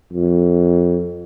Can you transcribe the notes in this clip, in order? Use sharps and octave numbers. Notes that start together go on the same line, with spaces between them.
F2